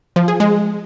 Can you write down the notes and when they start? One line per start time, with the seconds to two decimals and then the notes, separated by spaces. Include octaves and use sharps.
0.16 F3
0.28 G#4
0.40 G#3